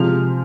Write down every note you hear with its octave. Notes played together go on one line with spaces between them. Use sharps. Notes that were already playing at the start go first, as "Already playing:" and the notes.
Already playing: C3 F3 G#3 F6